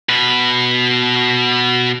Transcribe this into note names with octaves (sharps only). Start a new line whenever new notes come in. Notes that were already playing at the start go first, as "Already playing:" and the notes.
B2 B4